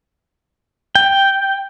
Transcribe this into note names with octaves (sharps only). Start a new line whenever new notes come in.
G5